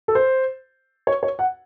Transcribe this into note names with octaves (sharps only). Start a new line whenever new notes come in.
A4
C5
C#5
C#5
F#5